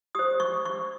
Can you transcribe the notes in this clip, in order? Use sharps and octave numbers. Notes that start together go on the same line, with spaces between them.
G4 C5 D#6
C#6
C#6